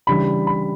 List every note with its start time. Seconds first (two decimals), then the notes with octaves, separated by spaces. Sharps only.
0.07 C#3 E3 G3 D4 B5
0.47 B5